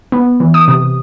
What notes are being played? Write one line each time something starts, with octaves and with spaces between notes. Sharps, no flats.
B3
E3
D#6
C3